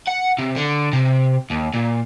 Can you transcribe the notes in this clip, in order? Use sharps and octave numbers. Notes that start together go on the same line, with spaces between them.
F#5
C3
D3
C3
D#2
A#2